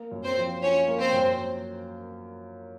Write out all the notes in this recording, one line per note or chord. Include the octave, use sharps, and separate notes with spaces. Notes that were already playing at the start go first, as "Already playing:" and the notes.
Already playing: A#3
F#2
C4 C5
F3
C#4 F4 C#5
A#3
C4 C5
F#2